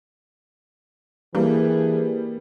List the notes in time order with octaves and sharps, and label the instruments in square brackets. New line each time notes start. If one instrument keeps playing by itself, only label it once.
[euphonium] E3 [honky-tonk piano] G3 [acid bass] A#3 [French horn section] D4 G#4 B4